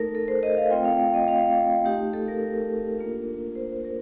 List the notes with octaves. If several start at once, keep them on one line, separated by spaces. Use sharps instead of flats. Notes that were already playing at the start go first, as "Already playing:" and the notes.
Already playing: A3 D#4 A4 A#4
A4
C5
D#5
F5
A3 C4 F4 G5
F5
D#5
F5
A3 D#4 G4
A4
A#4
A#3 D4 F4
C5
C5
A#4